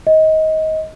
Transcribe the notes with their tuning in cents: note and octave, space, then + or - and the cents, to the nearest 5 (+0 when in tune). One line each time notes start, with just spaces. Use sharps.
D#5 +20